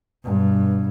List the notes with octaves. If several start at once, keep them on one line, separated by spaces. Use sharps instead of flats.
G2 B2